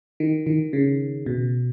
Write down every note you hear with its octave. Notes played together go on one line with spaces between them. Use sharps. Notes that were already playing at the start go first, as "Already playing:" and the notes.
D#3
D#3
C#3
B2